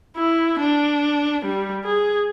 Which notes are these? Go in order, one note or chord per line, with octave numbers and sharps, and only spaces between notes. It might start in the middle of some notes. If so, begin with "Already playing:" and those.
E4
D4
G3
G#4